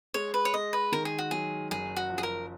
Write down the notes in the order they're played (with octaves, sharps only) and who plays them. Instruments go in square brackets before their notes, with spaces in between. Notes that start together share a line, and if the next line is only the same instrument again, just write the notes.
[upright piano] G#3 [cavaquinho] C#5
[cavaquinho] B4
C#5
[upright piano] G#3 [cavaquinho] D#5
[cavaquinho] B4
[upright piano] D#3 [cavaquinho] A#4
[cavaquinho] G#4
F#4
[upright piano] F#3 [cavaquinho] G#4
[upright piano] F#1 [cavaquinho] G#4
[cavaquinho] F#4
[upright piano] F3
[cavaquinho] G#4
A#4